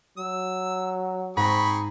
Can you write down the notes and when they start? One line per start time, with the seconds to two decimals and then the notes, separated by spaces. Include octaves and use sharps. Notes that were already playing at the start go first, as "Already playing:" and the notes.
0.18 F#3 E6
1.37 G#2 C4 G#4 A#5 B5 C#6